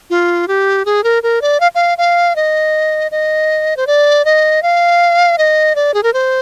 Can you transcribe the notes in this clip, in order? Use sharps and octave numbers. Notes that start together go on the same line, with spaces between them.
F4
G4
G#4
A#4
A#4
D5
F5
F5
F5
D#5
D#5
C5
D5
D#5
F5
D#5
D5
G#4
A#4
C5